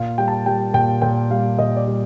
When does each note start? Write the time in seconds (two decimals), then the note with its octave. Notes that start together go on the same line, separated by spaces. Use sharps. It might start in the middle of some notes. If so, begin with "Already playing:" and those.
Already playing: A#2 F5
0.18 G3 G5
0.28 A5
0.46 G3 G5
0.74 A#2 G5
1.01 A#2 G5
1.31 G3 F5
1.59 A#2 D#5
1.77 D5
1.87 G3